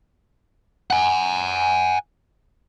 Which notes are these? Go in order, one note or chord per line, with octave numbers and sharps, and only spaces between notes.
F#5 G#5